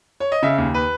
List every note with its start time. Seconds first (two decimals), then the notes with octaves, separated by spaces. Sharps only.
0.20 C#5
0.32 D#5
0.43 C#3 E5
0.58 D#2
0.74 B4